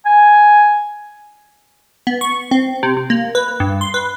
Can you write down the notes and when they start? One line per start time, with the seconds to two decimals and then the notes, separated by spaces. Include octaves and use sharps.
0.06 G#5
2.07 B3
2.21 C#6
2.51 C4
2.83 C3
2.97 C3
3.10 A#3
3.35 B4
3.60 G2
3.81 C6
3.94 B4